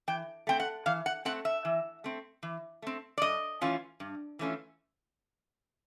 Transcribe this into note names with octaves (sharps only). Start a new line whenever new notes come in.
E3 G5
A3 C4 G5
F#5
E3 F5
F#5
A3 C4 F#5
E5
E3
A3 C4
E3
A3 C4
D5
G2 D#5
E3 A3 C#4 F4
G2
E3 A3 C#4 F4